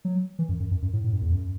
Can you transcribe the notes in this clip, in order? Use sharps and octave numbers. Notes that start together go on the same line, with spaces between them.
F#3
E3
F#2
F#2
F#2
F#2
A2
A2
F#2
E2
F#2